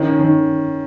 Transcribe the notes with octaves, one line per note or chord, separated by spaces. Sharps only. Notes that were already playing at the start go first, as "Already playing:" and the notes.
Already playing: D#3 C#4
D#3